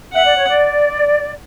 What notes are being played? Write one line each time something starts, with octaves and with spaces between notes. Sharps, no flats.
E5 F#5
D5
C#5
D5